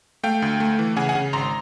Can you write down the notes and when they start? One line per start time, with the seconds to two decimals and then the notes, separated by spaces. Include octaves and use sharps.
0.23 A3 F5 G5
0.42 D2
0.60 A3
0.79 E3
0.96 C#3 F#5 G#5
1.09 F#5 G#5
1.15 C#3
1.33 G#1 A#5 C6